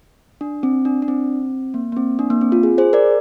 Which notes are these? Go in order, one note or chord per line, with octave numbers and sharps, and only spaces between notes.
D4
C4
D4
D4
C4
A#3
A#3
C4
D4
A#3
C4
F4
G#4
G#4 C5
A#4 D5